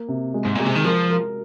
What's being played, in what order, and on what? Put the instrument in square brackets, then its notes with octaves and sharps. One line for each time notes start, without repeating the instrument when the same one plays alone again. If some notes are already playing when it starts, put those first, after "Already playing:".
Already playing: [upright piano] A#3
C3
G#3
[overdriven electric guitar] G#2
[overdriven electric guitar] A#2 [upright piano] G#3
[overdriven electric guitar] C3
D#3
[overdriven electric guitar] F3 [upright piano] A#4
[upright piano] A#4